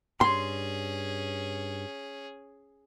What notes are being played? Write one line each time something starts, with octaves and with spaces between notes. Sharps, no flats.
G2 C#4 G#4 C6